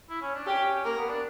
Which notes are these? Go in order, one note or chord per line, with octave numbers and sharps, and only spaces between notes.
E4
C#4
D4
C#4 G4
A#3 A#4
B3
D4